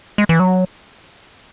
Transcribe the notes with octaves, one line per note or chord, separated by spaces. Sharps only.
G#3
E3
F#3